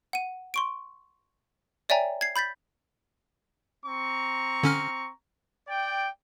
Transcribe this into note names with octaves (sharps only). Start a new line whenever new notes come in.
F#5 D#7
C6 C#6 D7
C#5 D5 E5 G5 G#5 A#5
G#6 C7
B5 G6 A6 B6
C4 A#5 C#6
D3 C#4 F6
D5 G5